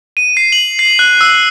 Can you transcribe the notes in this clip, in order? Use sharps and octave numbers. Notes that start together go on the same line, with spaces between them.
D#7
C7
F#7
C7
F#6
E6